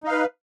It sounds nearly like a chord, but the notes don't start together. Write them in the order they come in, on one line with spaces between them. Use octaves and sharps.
D#4 F5 B4